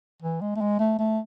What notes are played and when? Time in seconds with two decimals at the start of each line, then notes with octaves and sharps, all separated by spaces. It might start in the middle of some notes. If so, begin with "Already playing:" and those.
0.22 E3
0.41 G#3
0.56 A3
0.61 G#3
0.79 A3
0.99 A3